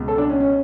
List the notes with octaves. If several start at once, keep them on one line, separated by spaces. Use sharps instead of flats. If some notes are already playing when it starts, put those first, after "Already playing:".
Already playing: C#2 B2
A4
D4
C#4
C#4